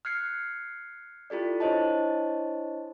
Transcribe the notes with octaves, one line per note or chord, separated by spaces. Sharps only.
F6 F#6 G#6 C7 C#7
E4 F4 G4 A4 D5
D4 E4 C5 C#5 D#5 A5